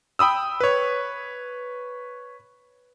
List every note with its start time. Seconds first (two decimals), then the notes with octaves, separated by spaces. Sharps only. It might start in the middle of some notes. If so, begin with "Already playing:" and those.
0.19 G5 B5 D#6 E6
0.60 B4 C#5